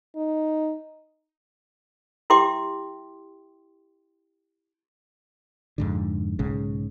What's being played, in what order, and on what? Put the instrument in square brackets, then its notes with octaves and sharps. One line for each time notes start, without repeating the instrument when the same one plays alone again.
[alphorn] D#4
[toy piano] E4 G4 E5 G5 C6 D6
[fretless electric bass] F2 G#2 D3
B1 G#2 C#3